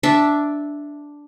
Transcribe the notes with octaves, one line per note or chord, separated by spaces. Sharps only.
D4 E5